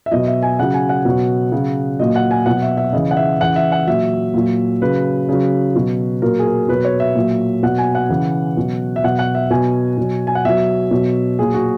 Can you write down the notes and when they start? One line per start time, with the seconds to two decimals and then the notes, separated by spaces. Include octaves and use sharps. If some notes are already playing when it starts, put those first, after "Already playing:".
0.06 E5
0.11 B2 F#3 D#5
0.27 E5
0.43 G#5
0.59 C#3 F#3 F#5
0.74 G#5
0.89 F#5
1.05 B2 F#3
1.52 C#3 F#3
1.99 A#2 F#3 D#5
2.15 F#5
2.31 G#5
2.46 B2 F#3 F#5
2.62 E5
2.77 E5
2.93 C#3 E3 D#5
3.11 F#5
3.17 E5
3.40 C#3 E3 F#5
3.56 E5
3.72 F#5
3.87 A#2 F#3 E5
4.34 A#2 F#3
4.81 C#3 F#3 B4
5.29 C#3 F#3
5.75 B2 F#3
6.22 A#2 F#3 A#4
6.39 G#4
6.46 A#4
6.68 B2 F#3 B4
6.85 C#5
7.00 E5
7.15 A#2 F#3
7.63 B2 F#3 F#5
7.78 G#5
7.95 F#5
8.09 C#3 E3
8.57 B2 F#3
8.96 E5
9.04 B2 F#3 F#5
9.19 F#5
9.35 E5
9.51 B2 F#3 G#5
9.98 B2 F#3
10.27 G#5
10.35 F#5
10.45 B2 F#3 E5
10.91 B2 F#3
11.38 A#2 F#3 G#4
11.54 F#4